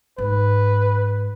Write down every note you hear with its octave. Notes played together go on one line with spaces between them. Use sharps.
G#2 B4